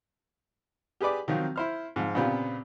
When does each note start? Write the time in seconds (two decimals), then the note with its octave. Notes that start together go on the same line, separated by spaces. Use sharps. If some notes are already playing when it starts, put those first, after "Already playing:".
1.01 G4 G#4 B4 D5 D6
1.28 D#3 F3 F#3 C4
1.56 E4 C5 F6
1.96 G#2 F3
2.15 A#2 C#3 B3 C4 F4 G4